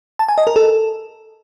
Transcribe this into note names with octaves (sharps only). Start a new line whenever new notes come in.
A5
G#5
D#5
A#4
A4